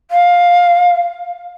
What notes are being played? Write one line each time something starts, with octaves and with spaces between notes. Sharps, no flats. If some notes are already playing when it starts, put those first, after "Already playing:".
F5